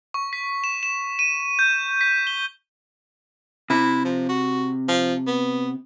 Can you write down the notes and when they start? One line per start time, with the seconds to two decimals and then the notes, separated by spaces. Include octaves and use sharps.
0.14 C#6
0.33 B6
0.64 E7
0.83 E7
1.19 D#7
1.59 G6
2.01 B6
2.27 G7
3.70 C3 E4
4.05 F3
4.29 F#4
4.88 F3
5.27 B3